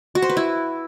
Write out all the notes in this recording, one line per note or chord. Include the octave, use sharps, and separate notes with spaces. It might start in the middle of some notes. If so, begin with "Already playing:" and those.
F#4
C5
B4
E4